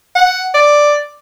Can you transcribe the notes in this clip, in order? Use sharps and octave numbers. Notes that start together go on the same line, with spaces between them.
F#5
D5